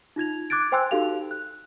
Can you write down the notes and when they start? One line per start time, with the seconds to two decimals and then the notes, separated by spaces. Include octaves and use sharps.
0.16 D#4 F4 G#6 F7
0.50 D6 F#6 G#6 A6 D7
0.72 C5 G5 G#5 C6 E6 F#6
0.91 D#4 F#4 G4 A4 F5 F7
1.31 F#6